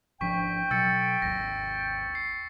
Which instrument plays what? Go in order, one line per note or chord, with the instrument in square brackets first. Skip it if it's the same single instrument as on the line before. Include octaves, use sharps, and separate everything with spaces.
[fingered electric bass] G#1 F3 D4 [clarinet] G5 [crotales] C#6 B6
[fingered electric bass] B2 F#3 [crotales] E6 A6 C#7
[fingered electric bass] G#1 D#2 [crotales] A#6
[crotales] C7